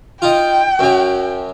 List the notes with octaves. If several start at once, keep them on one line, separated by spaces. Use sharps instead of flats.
D#4 F4 G5
F#2 F#3